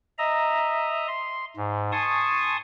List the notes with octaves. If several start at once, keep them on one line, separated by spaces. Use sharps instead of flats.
D#5 E5 A#5
C6
G#2
G#5 A5 C6 C#6 D#6